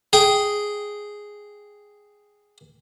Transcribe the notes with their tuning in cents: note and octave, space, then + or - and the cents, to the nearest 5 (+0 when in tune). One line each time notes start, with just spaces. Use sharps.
G#4 +0 G5 +0